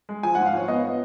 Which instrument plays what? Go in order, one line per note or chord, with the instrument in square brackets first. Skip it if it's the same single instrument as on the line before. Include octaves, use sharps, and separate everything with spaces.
[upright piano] G#3
F3 G#5
G#2 F#5
F5
F3 C#5
B3 D#5
B3